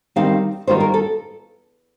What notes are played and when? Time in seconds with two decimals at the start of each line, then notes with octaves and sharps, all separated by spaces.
0.16 D#3 G3 C4 D#4 F5
0.67 D#3 G3 A#3 F4 C5
0.80 A#4
0.94 A4